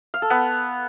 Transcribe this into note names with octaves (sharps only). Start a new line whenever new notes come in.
F5
A4
B3